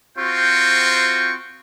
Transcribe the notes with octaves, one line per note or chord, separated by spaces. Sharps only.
C4 F4 F#4 C5 G5 C#6